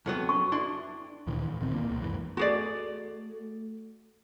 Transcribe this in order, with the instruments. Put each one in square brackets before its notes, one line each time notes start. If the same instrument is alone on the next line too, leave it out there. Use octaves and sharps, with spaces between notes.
[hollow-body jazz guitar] F2 F#3 B3
[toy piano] C#6
[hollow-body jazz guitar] D4 E4 C6
[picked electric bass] D2 A#2 D#3 E3
A1
D#1 A#1 D#3 C4
B2 A#3
C#2
C#2 F#2 E3
[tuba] A3 [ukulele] F#4 G#4 D5